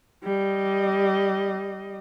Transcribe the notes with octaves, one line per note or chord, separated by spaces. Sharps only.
G3 D#5